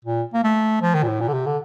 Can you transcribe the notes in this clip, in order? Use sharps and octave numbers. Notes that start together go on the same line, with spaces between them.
A#2
A#3
A3
F3
D#3
A#2
A2
A#2
D3
C3
D3